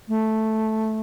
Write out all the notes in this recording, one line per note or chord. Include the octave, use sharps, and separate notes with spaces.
A3